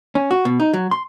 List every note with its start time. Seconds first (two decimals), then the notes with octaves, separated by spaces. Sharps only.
0.15 C#4
0.31 F#4
0.45 B2
0.60 D#4
0.74 F#3
0.91 C6